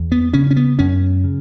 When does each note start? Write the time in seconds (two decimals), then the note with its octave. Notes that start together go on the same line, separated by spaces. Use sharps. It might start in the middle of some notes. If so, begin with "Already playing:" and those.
Already playing: E2
0.12 B3
0.34 C#3 C#4
0.51 C#4
0.56 B3
0.79 F#2 C#4
1.24 C#3